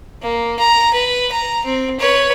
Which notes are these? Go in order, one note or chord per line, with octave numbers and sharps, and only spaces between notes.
A#3
A#5
B4
A#5
C4
B4 C#5